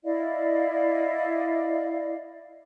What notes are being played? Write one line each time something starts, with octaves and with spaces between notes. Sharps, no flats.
E4 D5 D#5 F5